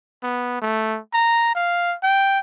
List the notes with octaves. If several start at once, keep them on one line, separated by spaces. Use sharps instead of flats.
B3
A3
A#5
F5
G5